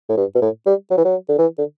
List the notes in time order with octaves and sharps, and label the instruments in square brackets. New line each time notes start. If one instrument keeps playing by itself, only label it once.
[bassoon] A2
G2
B2
A2
G3
F#3
E3
F#3
D3
E3
D3